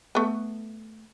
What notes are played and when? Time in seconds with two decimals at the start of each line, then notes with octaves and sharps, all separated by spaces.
0.15 A3 B3